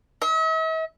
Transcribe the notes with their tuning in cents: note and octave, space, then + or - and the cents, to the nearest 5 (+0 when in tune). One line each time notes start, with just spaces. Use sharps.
E5 -45